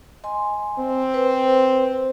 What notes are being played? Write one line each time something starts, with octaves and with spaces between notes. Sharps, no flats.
D#5 G#5 C6
C4
B4 C5